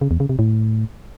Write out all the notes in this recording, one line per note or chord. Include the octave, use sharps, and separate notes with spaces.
C#3
E2
C#3
C3
A2